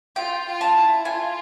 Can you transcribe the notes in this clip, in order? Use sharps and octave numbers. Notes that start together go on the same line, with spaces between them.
F4 G5
F4
A5
E4
F4 G#5